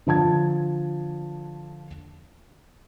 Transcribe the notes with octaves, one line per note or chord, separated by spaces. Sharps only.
D3 F3 A5 G#6